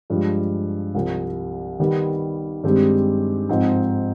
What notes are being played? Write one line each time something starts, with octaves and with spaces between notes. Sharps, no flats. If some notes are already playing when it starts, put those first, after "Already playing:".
G2 F3 G#3
C2 C3 F3
D#3 G3 B3
G2 D#3 G#3 C4 G4
G#2 F3 C4 D#4